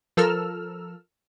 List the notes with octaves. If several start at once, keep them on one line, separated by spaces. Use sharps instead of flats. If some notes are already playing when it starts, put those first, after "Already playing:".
F3 A4 A#4 E6 F6